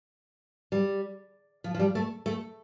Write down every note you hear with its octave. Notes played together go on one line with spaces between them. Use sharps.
G3
F3
F3
G3
A3
A3